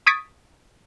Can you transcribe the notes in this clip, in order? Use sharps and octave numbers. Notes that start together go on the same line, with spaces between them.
C#6 D#6 G#6 A6 B6 D7